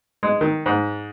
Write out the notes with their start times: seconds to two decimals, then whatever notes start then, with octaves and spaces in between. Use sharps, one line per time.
0.23 G#3
0.41 D#3
0.66 G#2